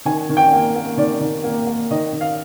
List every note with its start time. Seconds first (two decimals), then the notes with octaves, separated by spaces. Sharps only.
0.05 D#3 G#5
0.29 D#3
0.37 G5
0.53 A#3
0.76 A#3
0.97 D#3 D5
1.21 D#3
1.44 A#3
1.67 A#3
1.91 D#3 D#5
2.13 D#3
2.21 F5